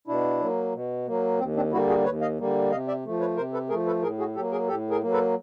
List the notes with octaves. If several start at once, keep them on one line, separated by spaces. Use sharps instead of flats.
B2 D4 E4
F#3 A#3
B2
F#3 A#3
D#2 C4
C4 D4
D3 G3 A#3 E4 F#4
F#4 G#4
D#2 B4 C#5
D#5 F5
D3 G3 A#3
C3 D#5 F5
D5 E5
F3 A3
B4 C#5
C3 A#4 C5
A4 B4
F3 A3 G#4 A#4
A4 B4
A2 G#4 A#4
F#4 G#4
F#3 A#3 G4 A4
G#4 A#4
A2 G4 A4
G#4 A#4
F#3 A#3
A4 B4